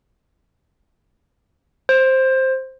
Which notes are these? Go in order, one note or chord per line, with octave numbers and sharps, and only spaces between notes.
C5